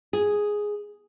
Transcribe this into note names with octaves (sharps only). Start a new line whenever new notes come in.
G#4